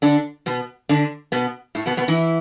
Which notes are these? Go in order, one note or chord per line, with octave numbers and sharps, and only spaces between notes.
D3 D4
B2 B3
D3 D4
B2 B3
A2 A3
B2 B3
B2 B3
E3 E4